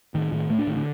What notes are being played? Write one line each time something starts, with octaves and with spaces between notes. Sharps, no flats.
A2 D#3
A2 D#3
A2 A3
D4
A2 D#3
D3